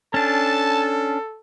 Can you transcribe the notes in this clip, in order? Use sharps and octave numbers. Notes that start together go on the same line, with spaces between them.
C#4 D4 A4 A5